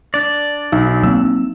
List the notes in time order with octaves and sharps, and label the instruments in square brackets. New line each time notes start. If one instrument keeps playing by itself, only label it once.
[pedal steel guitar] D4 D5
[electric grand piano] B1 [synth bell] D#4
[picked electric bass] F#3 A#3 C4 [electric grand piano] E6